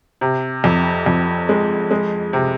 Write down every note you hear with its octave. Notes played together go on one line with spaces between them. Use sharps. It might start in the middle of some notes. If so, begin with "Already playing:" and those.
C3
F2
F2
G#3
G#3
C3